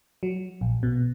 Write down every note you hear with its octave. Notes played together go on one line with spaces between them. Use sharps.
F#3
A#1
B2